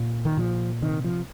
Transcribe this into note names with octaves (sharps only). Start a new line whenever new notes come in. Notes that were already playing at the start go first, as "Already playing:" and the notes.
Already playing: A#2
D#3
A#2 F3
C3 D#3
F3